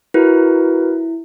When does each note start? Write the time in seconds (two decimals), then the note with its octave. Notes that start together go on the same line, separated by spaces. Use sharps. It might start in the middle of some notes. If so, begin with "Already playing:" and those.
0.14 E4 F#4 A#4 B4